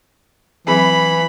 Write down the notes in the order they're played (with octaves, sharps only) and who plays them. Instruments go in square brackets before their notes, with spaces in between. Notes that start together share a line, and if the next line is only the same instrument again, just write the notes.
[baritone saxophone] E3 [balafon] F#3 C4 G#4 [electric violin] B5